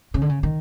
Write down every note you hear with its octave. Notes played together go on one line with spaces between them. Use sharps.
C#3
D3
C#3
D#3